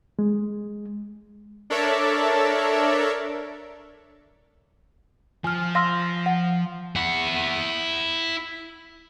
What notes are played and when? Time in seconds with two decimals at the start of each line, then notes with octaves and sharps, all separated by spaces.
0.19 G#3
1.70 D4 A4 A#4 C#5 D5 E5
5.44 F3 G#5 F6
5.75 F5 C6 E6 F6 A#6
6.26 F#5
6.96 E4 F#5